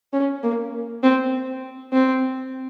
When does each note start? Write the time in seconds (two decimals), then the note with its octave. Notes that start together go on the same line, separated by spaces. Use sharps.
0.13 C#4
0.43 A#3
1.03 C4
1.93 C4